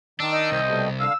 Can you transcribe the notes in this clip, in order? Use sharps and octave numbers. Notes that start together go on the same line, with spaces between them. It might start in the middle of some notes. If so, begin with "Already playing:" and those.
D#3 D4 E6
D#4 D#5
C2 C5
B2 G3 A3
D3 F5 E6